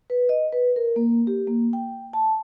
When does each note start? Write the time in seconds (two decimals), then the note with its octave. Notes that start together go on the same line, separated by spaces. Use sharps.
0.10 B4
0.29 D#5
0.52 B4
0.76 A#4
0.96 A#3
1.27 G4
1.47 A#3
1.73 G5
2.13 A5